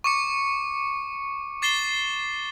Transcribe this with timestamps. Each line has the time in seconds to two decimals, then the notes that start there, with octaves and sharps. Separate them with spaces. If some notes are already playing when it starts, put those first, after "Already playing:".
0.04 C#6 D6 C#7
1.62 D6 A6 C7 E7 G7